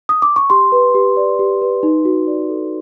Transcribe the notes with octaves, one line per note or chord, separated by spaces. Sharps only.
D#6
D6
C#6
G4 C6
B4
G4
D5
G4
B4
D#4
F#4
D5
A4